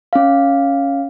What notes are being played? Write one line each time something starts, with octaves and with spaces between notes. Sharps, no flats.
C#4 F5